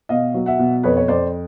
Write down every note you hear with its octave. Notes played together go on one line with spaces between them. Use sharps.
B2 D#5 F5
F#3
E5 F#5
B2
F2 B4 C#5
C#5
F2 C5 D5